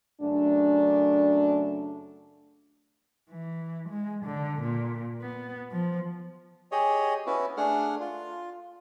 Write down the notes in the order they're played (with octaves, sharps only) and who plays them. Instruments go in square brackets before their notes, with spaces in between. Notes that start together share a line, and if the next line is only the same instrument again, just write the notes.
[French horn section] F#2 C#3 A3 D4
[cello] E3
G#3
D3
A#2
B3
F3
[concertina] G4 G#4 C#5 D#5
B3 C#4 E4 F#4 B4
A3 D4 G#4 F#5 F6
F4